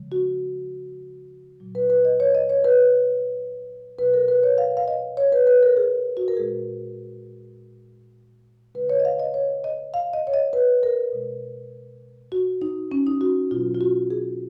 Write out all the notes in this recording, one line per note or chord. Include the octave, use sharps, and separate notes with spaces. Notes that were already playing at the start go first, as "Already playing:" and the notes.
Already playing: C#3 F3 G#3
F#4
A#2 F#3
B4
B4
D#5
C#5
D#5
C#5
B4
B2 F#3 B4
A#4
B4
C#5
F5
F5
D#5
C#5
B4
B4
A#4
G#4
F#4
A#4
A#2 G#3 G#4
C#3 G#3 B4
C#5
D#5
F5
D#5
C#5
D#5
F5
D#5
C#5
D#5
B4
A#4
B2 G#3
F#4
D#4
C#4
D#4
F#4
B2 F#3 F4
F4
F#4
G#4